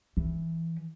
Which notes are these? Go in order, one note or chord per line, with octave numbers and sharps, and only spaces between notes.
E3